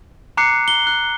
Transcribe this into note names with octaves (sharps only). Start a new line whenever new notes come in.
A#5 D6 F#6 C7 C#7
G7
F#6